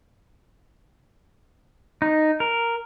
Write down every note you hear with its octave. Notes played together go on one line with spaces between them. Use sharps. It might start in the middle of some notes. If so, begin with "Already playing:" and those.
D#4
A#4